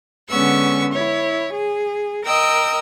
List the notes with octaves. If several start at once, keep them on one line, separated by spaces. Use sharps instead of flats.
D3 G#3 B3 C#4 C#6 E6
E4 C#5
G#4
A#4 D#5 G5 E6